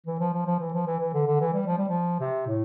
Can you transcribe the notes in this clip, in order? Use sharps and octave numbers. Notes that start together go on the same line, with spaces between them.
E3
F3
F3
F3
E3
F3
E3
E3
D3
D3
E3
G3
F3
G3
F3
C3
A2